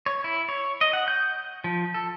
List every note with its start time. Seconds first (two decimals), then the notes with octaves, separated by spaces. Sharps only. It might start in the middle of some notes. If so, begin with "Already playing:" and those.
0.06 C#5
0.24 E4
0.49 C#5
0.81 D#5
0.93 F#5
1.08 G6
1.64 F3
1.94 A4